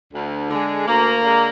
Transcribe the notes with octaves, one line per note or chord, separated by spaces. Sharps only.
D2
D3 G#3
D2 A#3
D3 G#3